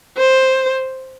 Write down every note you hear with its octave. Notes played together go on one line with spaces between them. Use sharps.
C5